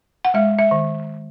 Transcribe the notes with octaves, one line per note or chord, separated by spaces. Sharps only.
F#5
G#3 E5
E5
D#3